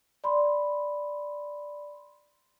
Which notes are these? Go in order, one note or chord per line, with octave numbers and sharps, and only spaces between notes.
D5 B5 C6